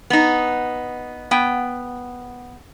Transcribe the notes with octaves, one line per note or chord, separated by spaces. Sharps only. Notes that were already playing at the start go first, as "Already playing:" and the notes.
B3 D#4
B3 G5